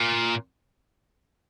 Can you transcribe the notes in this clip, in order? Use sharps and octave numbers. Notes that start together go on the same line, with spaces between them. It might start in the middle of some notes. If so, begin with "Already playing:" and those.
Already playing: A#2